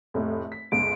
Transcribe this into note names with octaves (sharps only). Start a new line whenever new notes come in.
F1 A2
B6
G1 C#2 D7